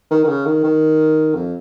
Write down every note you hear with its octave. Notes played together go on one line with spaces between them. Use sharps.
D#3
D#3
C#3
D#3
D#3
F2